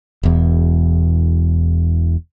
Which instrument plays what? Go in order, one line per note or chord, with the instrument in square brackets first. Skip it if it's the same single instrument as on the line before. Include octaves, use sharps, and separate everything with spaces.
[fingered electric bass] E1 E2